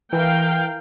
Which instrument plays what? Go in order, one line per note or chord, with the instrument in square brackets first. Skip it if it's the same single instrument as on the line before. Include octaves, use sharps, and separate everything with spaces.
[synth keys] E3 [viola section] A#4 F5 G5